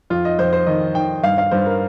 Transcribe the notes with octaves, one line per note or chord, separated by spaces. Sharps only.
F2 F4
D#5
F2 C5
C5
D#3 D#5
D#3 G5
G2 F5
F5
G2 C5
A#4